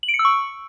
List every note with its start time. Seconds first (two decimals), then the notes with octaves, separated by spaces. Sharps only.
0.03 F#7
0.08 D7
0.14 C#7
0.19 E6
0.25 C#6